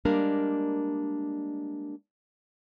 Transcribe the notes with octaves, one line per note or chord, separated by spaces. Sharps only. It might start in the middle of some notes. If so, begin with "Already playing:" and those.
G3 G#3 A#3 D4 A#4